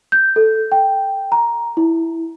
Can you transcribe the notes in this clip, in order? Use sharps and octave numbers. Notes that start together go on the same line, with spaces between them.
G6
A4
G5
A#5
E4